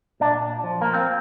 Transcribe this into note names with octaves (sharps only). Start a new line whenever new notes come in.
A#2 D4
F3
A#3
C4